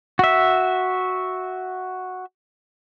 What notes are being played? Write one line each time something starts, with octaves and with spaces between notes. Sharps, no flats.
F#4 E5